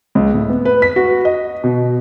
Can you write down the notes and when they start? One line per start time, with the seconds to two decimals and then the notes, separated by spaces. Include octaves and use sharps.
0.15 C#2
0.34 A2
0.49 B3
0.65 B4
0.82 B6
0.96 F#4
1.25 D#5
1.64 B2